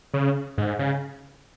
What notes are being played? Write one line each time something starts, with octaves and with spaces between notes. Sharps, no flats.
C#3
G#2
C#3